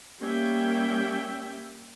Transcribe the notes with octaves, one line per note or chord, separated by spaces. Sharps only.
G3 A#3 C#4 E5 G5